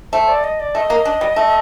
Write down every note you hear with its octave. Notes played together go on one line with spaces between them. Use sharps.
A3 C5
D5
D#5
D5
A3 D#5
A#3
D4
G3
A3